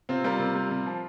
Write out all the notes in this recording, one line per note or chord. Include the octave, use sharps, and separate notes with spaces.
C3 C4 F4
G3 F4 A#4
C3
G3
C3
F3